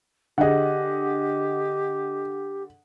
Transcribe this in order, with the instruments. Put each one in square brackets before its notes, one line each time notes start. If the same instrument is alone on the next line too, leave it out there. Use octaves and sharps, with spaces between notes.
[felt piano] D3 G#4 [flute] G4 [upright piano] D#5 F#5